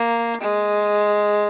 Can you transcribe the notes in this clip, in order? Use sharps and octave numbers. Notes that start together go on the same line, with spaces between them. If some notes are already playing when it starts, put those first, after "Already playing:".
Already playing: A#3
G#3